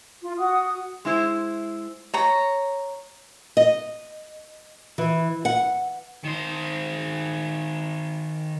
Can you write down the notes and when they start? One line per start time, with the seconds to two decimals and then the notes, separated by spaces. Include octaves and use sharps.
0.21 F4
0.39 F#4 F#5 D#6
1.05 G#3 E4 C5
2.14 C#5 A#5
3.57 D#5
4.98 E3
5.45 F#5
6.24 D#3 C5